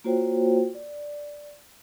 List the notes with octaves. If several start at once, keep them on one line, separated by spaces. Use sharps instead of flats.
A#3 F4 F#4 C5 C#5 G5
D5